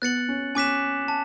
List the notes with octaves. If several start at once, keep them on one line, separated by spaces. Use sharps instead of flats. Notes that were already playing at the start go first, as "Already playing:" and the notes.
B3 F#6 A6 C#7 F#7
C#4
C#4 G#5 D6 F#6 B6 E7
A5